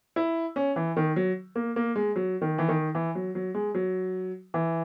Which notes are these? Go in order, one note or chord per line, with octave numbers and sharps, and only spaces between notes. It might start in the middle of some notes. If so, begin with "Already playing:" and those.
E4
C#4
E3
D#3
F#3
A#3
A#3
G#3
F#3
D#3
E3
D#3
E3
F#3
F#3
G#3
F#3
E3